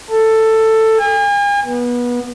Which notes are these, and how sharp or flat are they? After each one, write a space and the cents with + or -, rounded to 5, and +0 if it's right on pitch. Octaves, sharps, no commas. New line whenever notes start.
A4 +10
G#5 -40
B3 -25